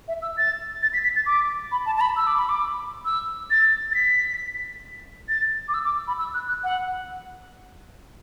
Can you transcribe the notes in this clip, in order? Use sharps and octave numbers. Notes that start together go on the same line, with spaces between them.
E5
E6
A6
A6
B6
B6
A6
D6
B5
A5
A5
B5
E6
D6
B5
D6
E6
A6
A6
B6
A6
D6
E6
D6
B5
E6
F#6
F#6
F#5